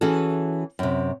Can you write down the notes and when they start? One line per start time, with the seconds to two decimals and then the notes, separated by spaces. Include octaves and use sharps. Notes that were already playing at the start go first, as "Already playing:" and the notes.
0.01 E3 C#4 F#4 G#4 A4
0.79 F#2 C3